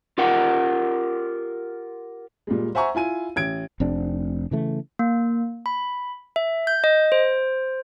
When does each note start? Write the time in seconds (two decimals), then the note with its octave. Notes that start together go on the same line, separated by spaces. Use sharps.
0.18 F4 G4 A#4 F#5
2.47 A#2 G3 G#3
2.75 C5 E5 F#5 G#5 A#5 C#6
2.95 E4 F4 G#5 D#7
3.36 A1 G#6 D7
3.80 F1 C3 C4 D4
4.51 C#3 E3 A3
4.99 A#3
5.66 B5
6.36 E5
6.67 G6
6.84 D#5
7.12 C5